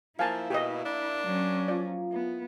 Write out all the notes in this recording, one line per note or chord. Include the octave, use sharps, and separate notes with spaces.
F3 A#3 E4 F5 G#5 A5
B2 G4 D#5
D4
F#3 C#4
F3 D5
B3 E4